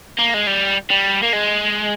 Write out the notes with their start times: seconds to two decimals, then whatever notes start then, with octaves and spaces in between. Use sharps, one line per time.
0.19 A#3
0.34 G#3
0.47 G3
0.90 G3
1.23 A#3
1.33 G#3